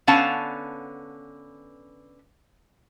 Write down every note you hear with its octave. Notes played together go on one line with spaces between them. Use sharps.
D3 B3 C#4 F5 F#5 A5